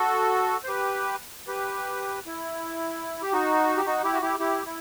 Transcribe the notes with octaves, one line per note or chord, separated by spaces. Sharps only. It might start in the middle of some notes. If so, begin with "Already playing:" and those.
Already playing: F#4 A4
C5
G4 B4
G4 B4
E4
G4
D#4 F#4
G4
D#4 F#4
E4 G4
F#4
E4 G4
E4 G4
E4